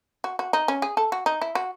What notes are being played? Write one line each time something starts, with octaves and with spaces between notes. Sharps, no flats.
F#4
F#4
D#4
C#4
G#4
A4
F#4
D#4
E4
F#4